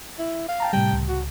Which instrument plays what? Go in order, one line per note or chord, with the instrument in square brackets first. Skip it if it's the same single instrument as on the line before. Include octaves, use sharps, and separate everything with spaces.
[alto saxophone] E4
F5
[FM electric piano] G5 A5 A#5
[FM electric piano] A2 C3 G3 [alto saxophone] G5
[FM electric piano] C#2
[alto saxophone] F#4